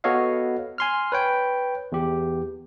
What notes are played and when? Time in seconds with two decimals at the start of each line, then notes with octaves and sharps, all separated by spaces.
0.04 B3 F#4 A4 C#5 D#5 F5
0.78 G#5 C6 F6
1.12 B4 C#5 G5
1.92 E2 G4